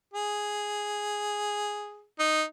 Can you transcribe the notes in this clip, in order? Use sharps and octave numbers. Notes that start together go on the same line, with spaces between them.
G#4
D#4